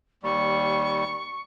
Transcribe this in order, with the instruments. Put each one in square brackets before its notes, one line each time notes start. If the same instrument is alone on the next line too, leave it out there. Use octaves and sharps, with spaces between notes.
[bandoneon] D#2 G3 [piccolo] C#6